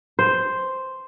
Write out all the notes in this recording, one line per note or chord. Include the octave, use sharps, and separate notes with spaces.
C5